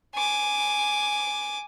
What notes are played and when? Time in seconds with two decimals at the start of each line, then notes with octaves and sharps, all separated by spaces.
0.15 G#5 D6